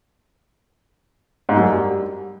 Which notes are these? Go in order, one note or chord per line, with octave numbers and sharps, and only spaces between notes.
G#2
F#2
G3